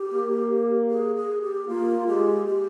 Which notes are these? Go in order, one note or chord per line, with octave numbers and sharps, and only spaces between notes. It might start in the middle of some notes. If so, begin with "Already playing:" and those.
Already playing: G4
A#3
G#4
G#4
G4
A#3 F4
G#3 G4
G4